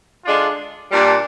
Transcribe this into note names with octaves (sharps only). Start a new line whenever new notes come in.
D3 G#3 D4 F4
A#2 G3 D4